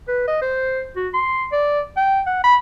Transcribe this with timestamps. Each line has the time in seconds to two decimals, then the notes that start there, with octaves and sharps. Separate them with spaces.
0.08 B4
0.28 D#5
0.42 C5
0.96 F#4
1.14 C6
1.52 D5
1.97 G5
2.26 F#5
2.44 B5